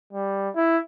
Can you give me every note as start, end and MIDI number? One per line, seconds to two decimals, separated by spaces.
0.13 0.50 55
0.55 0.78 64